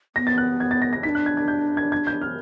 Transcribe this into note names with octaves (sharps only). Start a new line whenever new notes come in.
B3 A#6
A6
F#6
G#6
A6
A#6
A#6
D#4 B6
D4
F#6
G#6
G#6
G6
G#6
G#6
G6
F6